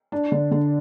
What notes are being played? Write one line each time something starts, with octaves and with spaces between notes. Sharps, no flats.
D4
D3
D3